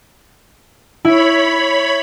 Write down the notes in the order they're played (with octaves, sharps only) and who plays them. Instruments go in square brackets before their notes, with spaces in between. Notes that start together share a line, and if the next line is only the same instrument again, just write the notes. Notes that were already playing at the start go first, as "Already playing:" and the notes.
[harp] E4 [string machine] C#5 B5